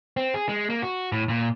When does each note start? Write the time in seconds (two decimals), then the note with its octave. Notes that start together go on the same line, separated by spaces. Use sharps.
0.17 C4
0.34 G#4
0.49 G#3
0.70 A#3
0.82 F#4
1.12 A2
1.29 A#2